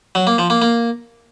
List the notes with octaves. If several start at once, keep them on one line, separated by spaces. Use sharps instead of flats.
F#3
A#3
F3
A#3
A#3